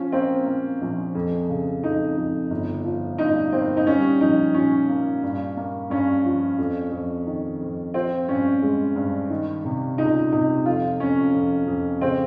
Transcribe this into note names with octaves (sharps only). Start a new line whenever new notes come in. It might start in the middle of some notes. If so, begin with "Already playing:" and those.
Already playing: F3 C#4
A#3 C4
A#3
A#1
F2
C#3
F2 D#4
F2
G1
F3
G2 D#4
A#3 C4
D#4
G3 C#4
A#1 D#4
A#2 C#4
A#3
G2
A#3
G2 C#4
F3
F2
F2
D#3
F2
F3 C4
G2 C#4
G#3
G2
D#3
C3
C#2 D#4
C3 D#4
F2 F4
F2 C#4
F2
F2
C#3 C4